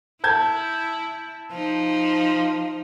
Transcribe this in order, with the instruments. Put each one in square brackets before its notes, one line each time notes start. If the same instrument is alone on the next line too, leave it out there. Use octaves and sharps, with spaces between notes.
[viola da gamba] E4 [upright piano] A5 G6 G#6
[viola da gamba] F3 D#4